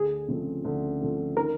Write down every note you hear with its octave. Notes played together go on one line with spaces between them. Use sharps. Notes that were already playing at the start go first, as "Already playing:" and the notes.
Already playing: D2 G#4
C#3 F3 A3 C4
D2
C#3 F3 A3 C4
D#3 A#4